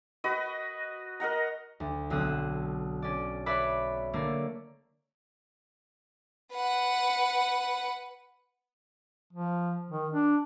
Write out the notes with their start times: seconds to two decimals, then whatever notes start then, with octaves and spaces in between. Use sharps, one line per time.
0.24 F#4 B4 D#5
1.20 A#4 D#5 F#5 A#5
1.80 D2
2.10 B1 D3 C4 D#6 E6 F#6
3.02 C#4 D5
3.46 B4 C#5 D5 E5 B5 D6
4.13 D3 A3 A#3 C#5 D5
6.54 B4 F#5
9.33 F3
9.91 D#3
10.13 D4